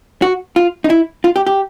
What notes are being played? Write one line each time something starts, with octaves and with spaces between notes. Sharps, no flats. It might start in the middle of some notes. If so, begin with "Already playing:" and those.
F#4
F4
D#4
E4
F4
G4
G4